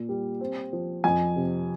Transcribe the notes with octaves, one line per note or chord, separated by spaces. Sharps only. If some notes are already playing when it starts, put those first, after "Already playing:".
Already playing: A#2
G3
C4
F3
F2 G#5
C3